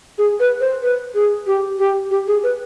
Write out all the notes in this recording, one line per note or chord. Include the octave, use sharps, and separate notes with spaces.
G#4
B4
C5
B4
G#4
G4
G4
G4
G#4
B4